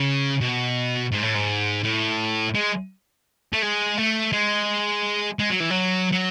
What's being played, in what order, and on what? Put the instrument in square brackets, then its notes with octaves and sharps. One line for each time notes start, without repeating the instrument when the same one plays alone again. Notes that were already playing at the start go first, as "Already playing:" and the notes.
Already playing: [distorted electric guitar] C#3
B2
G#2
A2
G#2
A2
G#3
A3
G#3
A3
G#3
G#3
F#3
E3
F#3
F#3